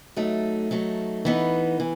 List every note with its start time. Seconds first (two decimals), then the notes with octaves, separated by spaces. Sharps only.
0.16 F#3 A3 D#4
0.71 F#3 A3 D#4
1.25 E3 B3 D#4
1.80 E3